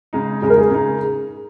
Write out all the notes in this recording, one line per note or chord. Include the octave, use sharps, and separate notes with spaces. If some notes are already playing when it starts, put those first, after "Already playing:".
C#3 G#3 D#4
C#3 G#3 D#4 G#4
A#4
G#4
C#3 G#3 D#4